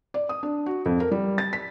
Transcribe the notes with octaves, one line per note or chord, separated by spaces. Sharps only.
D5
D#6
D4
F#4
F2
A#4
G3
A6
B6